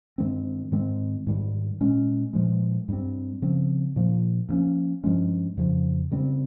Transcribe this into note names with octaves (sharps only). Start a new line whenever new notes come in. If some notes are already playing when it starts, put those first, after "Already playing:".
G2 D#3 G#3 C4
G#2 D#3 G#3 C4
G#2 D#3 G3
A#2 G#3 C#4
A#2 F3 G#3
G2 G3 C4
C#3 F3 C4
A#2 F3 A#3
G2 F3 A#3 C#4
G2 F3 G#3 C#4
F2 C#3 F3
C#3 G3 C4